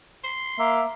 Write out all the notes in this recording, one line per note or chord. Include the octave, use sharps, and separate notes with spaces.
C6
A#3 E5